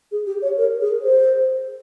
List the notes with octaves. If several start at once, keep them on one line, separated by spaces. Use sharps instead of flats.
G#4
G4
C#5
A#4
G#4
C5